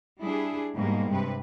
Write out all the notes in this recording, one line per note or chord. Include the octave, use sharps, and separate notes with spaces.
G3 D4 E4 G#4
G#2 B2 G3 G#3 A#3
G2 C3 B4